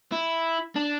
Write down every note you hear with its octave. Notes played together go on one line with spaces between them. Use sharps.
E4
D4